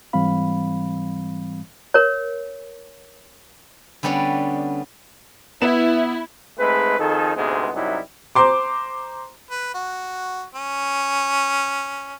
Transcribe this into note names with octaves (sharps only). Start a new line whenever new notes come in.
G#2 E3 G3 C4 F5 B5
A#4 C#5
D3 G3 B3 C#4 D5
B3 E4 E7
G#2 G#3 A3 C4 B4
F2 D#3 D#4 G#4 A4
D2 G#2 C3 G#3 B3
C2 F#2 F#3 G3 D#4 E4
C5 A#5 C6 D6
B4
F#4
C#4